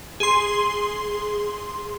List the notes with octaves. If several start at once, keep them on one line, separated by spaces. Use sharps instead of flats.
G#4 C6